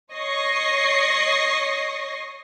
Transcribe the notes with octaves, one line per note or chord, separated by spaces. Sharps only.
C#5 D#5 C#6 A#6 C7